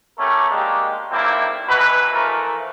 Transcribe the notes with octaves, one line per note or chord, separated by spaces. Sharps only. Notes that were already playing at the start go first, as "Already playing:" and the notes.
A3 C#4 G4 A4 A#4
G#3 A#3 D4 D#4 G4
B1 A#3 C4 D4 E4
B2 E3 F#3 B4
E3 F3 A3 A#4